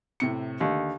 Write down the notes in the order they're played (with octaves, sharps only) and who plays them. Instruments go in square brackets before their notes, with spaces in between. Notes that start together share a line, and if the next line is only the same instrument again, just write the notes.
[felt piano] A2 C3 C#7
[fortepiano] D#2 [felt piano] D3